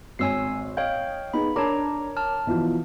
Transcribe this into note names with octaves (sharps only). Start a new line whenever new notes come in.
G#1 C#5 G#5 E6 C7
C#5 D#5 F5 G5 G6
B3 D#4 G#4 B5
D4 A#4 C#5 A#5 D6
A5 F6
B2 E3 F3